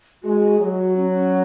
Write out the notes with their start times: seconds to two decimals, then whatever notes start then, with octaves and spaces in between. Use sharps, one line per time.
0.23 G#3 F#4
0.60 F#3 G#4
0.65 F#4
0.96 C#4
1.13 C#4